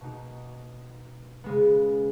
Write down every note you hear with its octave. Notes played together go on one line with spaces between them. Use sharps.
B2 A#3 D#4 F#4
C#3 G#3 B3